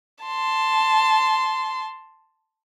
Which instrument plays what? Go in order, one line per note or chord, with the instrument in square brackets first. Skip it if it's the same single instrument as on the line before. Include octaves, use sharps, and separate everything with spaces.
[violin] A5 C6